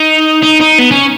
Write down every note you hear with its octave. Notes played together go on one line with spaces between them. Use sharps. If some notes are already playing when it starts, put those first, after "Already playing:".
Already playing: D#4
D#4
D#4
B3
C#4